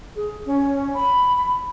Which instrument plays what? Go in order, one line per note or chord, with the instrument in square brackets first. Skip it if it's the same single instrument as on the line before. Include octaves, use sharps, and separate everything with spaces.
[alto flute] G#4
C#4
B5